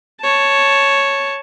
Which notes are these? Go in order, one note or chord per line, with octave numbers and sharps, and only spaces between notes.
C#5 A5